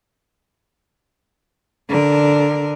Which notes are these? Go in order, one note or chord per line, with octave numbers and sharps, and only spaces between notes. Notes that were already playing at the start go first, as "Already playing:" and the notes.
D3 A#4